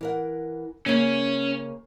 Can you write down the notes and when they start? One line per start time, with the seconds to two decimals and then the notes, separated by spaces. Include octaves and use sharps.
0.01 E3 A#4 F#5
0.86 C#3 A#3 C#4 C#5